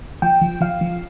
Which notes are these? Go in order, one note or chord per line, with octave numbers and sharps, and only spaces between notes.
F3 G5
F3
F3 F5
F3